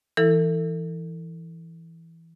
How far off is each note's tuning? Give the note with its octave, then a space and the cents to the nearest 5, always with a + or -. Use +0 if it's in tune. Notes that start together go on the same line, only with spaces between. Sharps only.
E3 +0 E4 +0 A4 +40